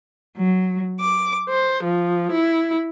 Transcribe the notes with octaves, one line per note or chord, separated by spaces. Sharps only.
F#3
D6
C5
F3
E4